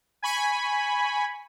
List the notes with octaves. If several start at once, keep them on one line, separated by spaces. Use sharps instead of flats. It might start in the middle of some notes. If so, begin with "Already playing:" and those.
G#5 B5 C#6